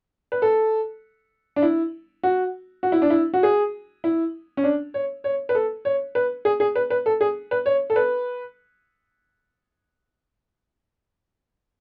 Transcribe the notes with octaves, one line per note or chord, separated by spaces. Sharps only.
B4
A4
D4
E4
F#4
F#4
E4
D4
E4
F#4
G#4
E4
C#4
D4
C#5
C#5
B4
A4
C#5
B4
G#4
G#4
B4
B4
A4
G#4
B4
C#5
A4
B4